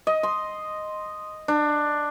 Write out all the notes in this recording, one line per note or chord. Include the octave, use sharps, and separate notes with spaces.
D#5
C6
D4